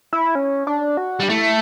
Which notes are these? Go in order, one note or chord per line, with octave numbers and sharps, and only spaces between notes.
E4
C#4
D4
F#4
G3 D4
A3 E4